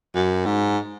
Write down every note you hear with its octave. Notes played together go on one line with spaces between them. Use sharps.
F#2
G#2